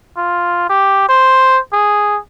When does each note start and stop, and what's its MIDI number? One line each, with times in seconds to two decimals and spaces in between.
0.17 0.68 65
0.69 1.08 67
1.09 1.59 72
1.73 2.19 68